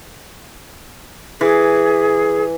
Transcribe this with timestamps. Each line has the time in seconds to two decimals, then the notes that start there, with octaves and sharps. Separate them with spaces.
1.41 E3 G#4